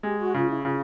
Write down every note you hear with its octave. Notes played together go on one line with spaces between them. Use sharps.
G#3 G4
F#4
C#3 F4
E4
C#3 F4